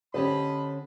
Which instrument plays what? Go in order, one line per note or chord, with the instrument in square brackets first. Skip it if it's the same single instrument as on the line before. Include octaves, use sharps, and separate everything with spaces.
[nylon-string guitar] D3 C#4 [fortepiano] G4 C5 [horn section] D#5 A5 B5